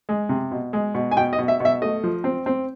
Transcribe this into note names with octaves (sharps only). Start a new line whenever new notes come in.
G#3
C3
B2
G#3
B2
G#5
B2 G5
D#5
B2
E5
B2 E5
A3 D#5
F3
C4
C4